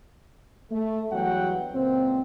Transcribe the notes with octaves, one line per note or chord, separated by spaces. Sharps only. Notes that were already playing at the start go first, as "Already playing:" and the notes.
A3
E2 G2 F#3 F#5 G5
C#2 A#2 C4